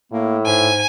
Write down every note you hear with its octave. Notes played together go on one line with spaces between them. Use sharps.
A2 A#3
G#2 G#5